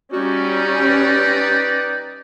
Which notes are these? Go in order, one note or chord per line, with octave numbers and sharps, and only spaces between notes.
G3 C#4 D#4 F#4 G4 D5
B4